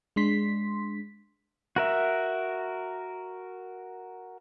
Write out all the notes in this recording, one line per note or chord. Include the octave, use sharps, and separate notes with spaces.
G#3 D4 C6 B6
F#4 A#4 E5